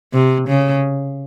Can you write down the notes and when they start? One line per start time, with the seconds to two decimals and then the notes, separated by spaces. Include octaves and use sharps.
0.13 C3
0.48 C#3